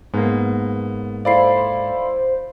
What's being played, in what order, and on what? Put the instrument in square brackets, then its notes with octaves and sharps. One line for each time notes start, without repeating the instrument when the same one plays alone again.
[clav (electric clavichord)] G#2 A#3 [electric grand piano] B3
[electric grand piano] E4 A4 D5 [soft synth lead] C5 [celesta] F5 B5 C7